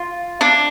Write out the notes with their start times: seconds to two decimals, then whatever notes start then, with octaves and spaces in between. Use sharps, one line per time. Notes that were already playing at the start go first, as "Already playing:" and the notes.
Already playing: F4
0.41 D4